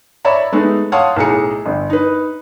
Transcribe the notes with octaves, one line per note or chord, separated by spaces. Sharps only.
C#5 D5 E5 A#5 B5
G#3 A3 B3 D#4
C#5 F5 F#5 A5 C6 D#6
B1 A2 G#4 A#5 C#7
G1
D#4 B4